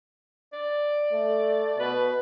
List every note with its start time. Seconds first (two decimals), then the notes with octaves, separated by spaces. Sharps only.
0.53 D5
1.13 A3
1.79 B2 B4